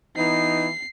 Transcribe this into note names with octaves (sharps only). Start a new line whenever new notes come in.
E3 B3 D#4 C7